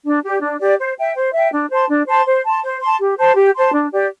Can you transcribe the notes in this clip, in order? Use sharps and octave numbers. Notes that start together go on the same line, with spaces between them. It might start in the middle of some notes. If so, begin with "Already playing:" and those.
D4
G4 D5
D4
G4 D5
C5
E5 G5
C5
E5 G5
D4
C5 A5 C6
D4
C5 A5 C6
C5
A5 C6
C5
A5 C6
G4
C5 A5 C6
G4
C5 A5 C6
D4
G4 D5